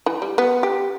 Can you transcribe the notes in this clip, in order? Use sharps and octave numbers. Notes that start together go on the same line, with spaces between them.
E3
G3
B3
G4